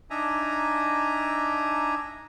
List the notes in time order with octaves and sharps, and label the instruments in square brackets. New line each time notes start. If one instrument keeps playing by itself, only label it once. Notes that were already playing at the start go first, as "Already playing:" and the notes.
[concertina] D4 D#4 E5 G#5 A#5